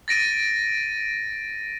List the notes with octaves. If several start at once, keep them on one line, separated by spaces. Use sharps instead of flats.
A6 A#6 D7 D#7